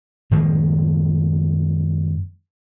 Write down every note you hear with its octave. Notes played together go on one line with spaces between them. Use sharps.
F#2 D#3 F3 G#3